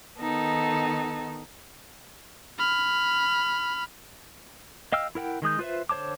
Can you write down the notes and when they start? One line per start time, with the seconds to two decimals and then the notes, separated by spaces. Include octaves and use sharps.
0.17 D#3 B3 D#4 A4
2.59 B5 F6
4.92 D#5 F5 G5 E6 F6
5.15 E4 A#4 F#5 G5
5.42 D#3 G#3 D#6 G6
5.59 F4 B4 C5 E5
5.89 D3 C5 C#5 A5 D6